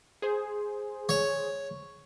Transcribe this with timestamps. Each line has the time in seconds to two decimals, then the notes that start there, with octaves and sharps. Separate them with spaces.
0.22 G#4 C5
1.09 C#5